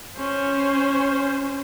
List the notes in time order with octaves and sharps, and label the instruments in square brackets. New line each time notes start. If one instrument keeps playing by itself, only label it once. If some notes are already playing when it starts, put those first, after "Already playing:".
[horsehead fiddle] C#4 C5